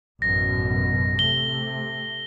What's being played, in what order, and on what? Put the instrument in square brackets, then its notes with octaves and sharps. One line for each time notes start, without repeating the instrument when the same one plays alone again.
[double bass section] A1 F#2 B2 [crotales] A#6
[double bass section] C3 A3 [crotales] G7